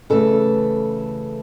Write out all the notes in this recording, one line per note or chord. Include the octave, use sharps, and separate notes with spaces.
C#3 E3 A3 A4